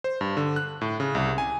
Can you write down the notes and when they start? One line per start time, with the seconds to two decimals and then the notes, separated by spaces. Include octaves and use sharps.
0.04 C5
0.21 G2
0.37 D3
0.56 F#6
0.81 A2
1.00 C#3
1.15 C2
1.38 G#5